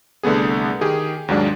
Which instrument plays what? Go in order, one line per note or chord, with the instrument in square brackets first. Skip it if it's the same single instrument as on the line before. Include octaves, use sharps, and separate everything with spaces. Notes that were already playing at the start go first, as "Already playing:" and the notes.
[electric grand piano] C2 D3 A3 B3 G#4
D#3 G4 G#4
D#2 G#2 F#3 G#3 D4